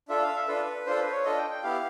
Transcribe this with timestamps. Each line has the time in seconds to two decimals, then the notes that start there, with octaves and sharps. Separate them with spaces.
0.09 D4 F4 A4 E5
0.22 F5
0.35 E5
0.48 D4 F4 A4 B4
0.86 D4 F4 A4 C5
1.00 B4
1.12 C#5
1.25 D4 F4 A4 D#5
1.38 G5
1.51 G5
1.63 B3 E4 G4 F5